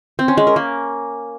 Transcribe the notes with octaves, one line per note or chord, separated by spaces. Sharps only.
C4
C#4
G#3
A#4
A#3